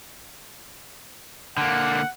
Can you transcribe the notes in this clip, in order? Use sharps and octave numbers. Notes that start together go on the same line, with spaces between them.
D3 A#3 F#5